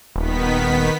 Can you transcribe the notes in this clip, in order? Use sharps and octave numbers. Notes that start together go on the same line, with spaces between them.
D#1 D#3 B3 B6